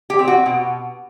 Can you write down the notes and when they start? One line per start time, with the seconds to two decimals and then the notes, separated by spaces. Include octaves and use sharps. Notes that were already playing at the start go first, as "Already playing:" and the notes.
0.10 G4
0.19 C4
0.28 F#4
0.46 B2